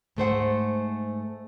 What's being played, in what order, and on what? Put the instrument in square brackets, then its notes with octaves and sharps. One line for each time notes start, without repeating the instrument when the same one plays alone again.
[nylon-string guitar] G#2 A3 C5 F#5